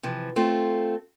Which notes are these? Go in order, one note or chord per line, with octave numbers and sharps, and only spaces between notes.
C3 E3 F3
A3 C4 F4